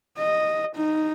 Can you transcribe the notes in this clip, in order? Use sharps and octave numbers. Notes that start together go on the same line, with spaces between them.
D#5
D#4